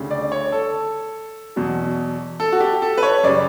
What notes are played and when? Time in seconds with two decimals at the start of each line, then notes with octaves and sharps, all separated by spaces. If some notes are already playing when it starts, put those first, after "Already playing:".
Already playing: D2 C#3 G3
0.11 D5
0.32 C#5
0.52 A4
1.56 E2 B2 F#3
2.40 A4
2.52 F#4
2.60 G4
2.82 A4
2.97 B4
3.03 C#5
3.23 F#2 C#3 G3 D5